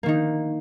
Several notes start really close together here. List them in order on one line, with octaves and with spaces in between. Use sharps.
A#3 D#3 D#4